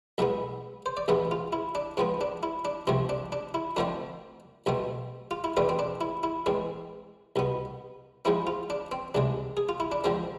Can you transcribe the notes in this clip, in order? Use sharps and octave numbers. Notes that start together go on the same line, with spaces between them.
B1 A2 G#3 B3 E5
C5
D5
A1 G#2 G#3 B3 E5
F4
E4
D4
G#2 F3 B3 C4
D4
E4
D4
C2 C3 F3 A3 C4
D4
D4
E4
F2 D3 F3 A3 C4 D4
B1 B2 A3 C4
F4
E4
E2 B2 A3 C4 D4
C4
D4
E4
E4
A2 E3 G#3 C4
C2 B2 B3
G#2 F3 G#3 C4 E4
F4
D4
C4
C2 C3 G#3 D4
G#4
F4
E4
D4
F2 D3 F3 G#3 C4